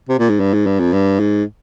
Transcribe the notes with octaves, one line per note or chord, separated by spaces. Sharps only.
C3
A#2
G#2
G2
G#2
G2
F2
G2
G#2